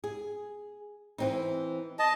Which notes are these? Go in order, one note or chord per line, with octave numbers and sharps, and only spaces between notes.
G#4
E3 C4 D#4
D#5 A5